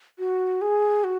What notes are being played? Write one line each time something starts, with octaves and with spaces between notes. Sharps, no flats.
F#4
G#4
F#4